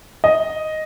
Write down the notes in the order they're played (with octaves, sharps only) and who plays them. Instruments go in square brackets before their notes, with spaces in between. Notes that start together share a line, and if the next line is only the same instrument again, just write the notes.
[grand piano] D#5